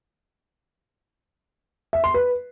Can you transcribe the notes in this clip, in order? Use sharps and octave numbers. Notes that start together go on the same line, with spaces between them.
E5
C6
B4